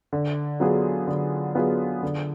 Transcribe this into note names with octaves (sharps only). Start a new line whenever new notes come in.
D3
F#3 B3 F4 G#4
D3
F#3 B3 F4 G#4
D3